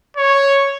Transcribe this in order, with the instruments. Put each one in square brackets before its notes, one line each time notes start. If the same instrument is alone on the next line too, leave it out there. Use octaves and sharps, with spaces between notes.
[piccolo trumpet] C#5